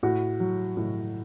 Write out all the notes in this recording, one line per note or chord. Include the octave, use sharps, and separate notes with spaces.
A2 F#4
F#3
A2